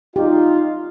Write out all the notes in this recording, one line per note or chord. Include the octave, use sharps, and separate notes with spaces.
D#4 F4 G4